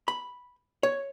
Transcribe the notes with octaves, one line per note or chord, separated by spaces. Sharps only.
B5
C#5